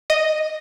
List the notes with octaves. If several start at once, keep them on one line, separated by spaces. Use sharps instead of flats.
D#5